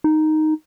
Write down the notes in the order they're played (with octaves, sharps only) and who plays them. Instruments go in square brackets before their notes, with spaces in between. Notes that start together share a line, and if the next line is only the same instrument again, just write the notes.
[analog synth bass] D#4